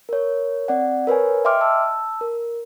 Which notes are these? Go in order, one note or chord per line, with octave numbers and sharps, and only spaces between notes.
A#4 C#5
C4 D5 F#5
A#4 B4 C#5 G#5
D#5 E5 G5 C6 D6 F6
A5 E6
A#4